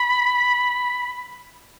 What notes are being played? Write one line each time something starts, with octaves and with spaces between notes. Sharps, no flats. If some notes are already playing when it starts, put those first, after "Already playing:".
Already playing: B5